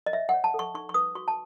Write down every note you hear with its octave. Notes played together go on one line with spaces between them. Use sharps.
D#5
C#5 E5
C#5 F#5
A5
A4
C#6
D#4 C#6
C#6
B4 D#6
F#4 C#6
A5